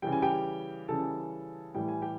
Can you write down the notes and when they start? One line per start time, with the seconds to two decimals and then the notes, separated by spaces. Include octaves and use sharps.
0.02 C#3 E3 G3 G5
0.12 G#5
0.22 G4 G5
0.88 C#3 E3 G3 A4 A5
1.75 A2 E3 G3 G5
1.88 G#5
2.02 G4 G5